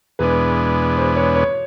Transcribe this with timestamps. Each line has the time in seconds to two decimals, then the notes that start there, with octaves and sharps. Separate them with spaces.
0.19 E2 B2 G#3 B3 D4 B4
0.97 C5
1.16 C#5
1.36 C#5